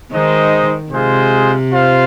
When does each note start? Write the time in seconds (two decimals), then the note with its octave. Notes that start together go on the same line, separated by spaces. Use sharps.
0.12 D#3 G#3 D#4 C5 D#5
0.91 C3 G#3 F4 G#4 C5
1.70 F4 C5 F5